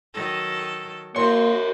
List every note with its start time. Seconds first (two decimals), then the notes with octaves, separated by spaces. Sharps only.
0.14 D#3 F#3 A4
1.16 A#3 F#4 A#4 C#5 C6